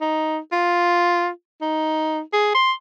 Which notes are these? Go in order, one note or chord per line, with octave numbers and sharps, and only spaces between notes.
D#4
F4
D#4
G#4
C6